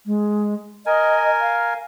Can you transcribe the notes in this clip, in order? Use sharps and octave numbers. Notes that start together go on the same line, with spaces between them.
G#3
A#4 D#5 G#5
F5